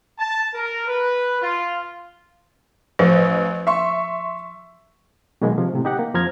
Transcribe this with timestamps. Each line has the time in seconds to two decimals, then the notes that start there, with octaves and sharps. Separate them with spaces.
0.19 A5
0.54 A#4
0.88 B4
1.42 F4
2.99 A1 F3
3.67 E5 C6 C#6
5.41 B2 D#3 F#3 G#3 A#3
5.58 C3 F3
5.74 A2 C3 D#3
5.85 D#4 G4 F#5
5.99 A#3
6.14 F2 F3 A#5 F6 G#6